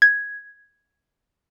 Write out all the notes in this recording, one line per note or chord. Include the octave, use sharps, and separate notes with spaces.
G#6